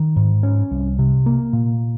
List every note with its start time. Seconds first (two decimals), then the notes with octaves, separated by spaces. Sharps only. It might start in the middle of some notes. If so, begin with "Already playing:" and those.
Already playing: D#3
0.16 G#2
0.43 C#4
0.71 C2
0.99 C3
1.26 A#3
1.53 A#2